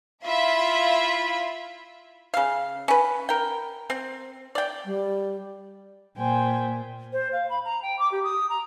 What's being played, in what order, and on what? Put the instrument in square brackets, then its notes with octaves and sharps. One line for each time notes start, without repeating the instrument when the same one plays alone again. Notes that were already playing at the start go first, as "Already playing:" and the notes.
[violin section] E4 F4 E5 B5
[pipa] C#3 F5
C#4 B4
A#4 G5
C4
D5 G5
[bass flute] G3
[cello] A#2 [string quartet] C5 G5 G#5
[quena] C5
F5
B5
A#5
G5
D6
G4
D#6
A#5